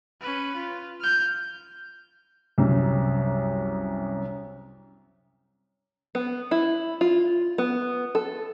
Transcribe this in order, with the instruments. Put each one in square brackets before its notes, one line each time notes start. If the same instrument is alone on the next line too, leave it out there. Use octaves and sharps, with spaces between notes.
[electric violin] C#4 B4
F4
F6 G6
[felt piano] C2 F#2
[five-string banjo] B3
E4
F4
B3
A4